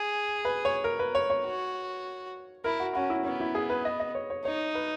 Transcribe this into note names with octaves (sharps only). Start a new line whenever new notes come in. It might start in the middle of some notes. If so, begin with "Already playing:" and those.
Already playing: G#4
B4
C#5
A#4
B4
C#5
C#5
F#4
E4 A#4
F#4
C#4 F#4
E4
B3 C#4
E4
G#4
B4
D#5
D#5
C#5
C#5
D#4 C#5
B4